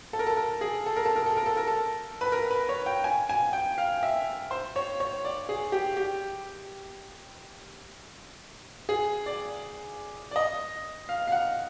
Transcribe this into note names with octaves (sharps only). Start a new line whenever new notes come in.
A4
A#4
A4
A#4
G#4
A4
A#4
A4
A#4
A4
A#4
A4
A#4
A4
B4
A#4
B4
C#5
G5
G#5
G#5
G5
F5
E5
C5
C#5
C#5
D5
G#4
G4
G4
G#4
D5
D5
D#5
F5
F5
F#5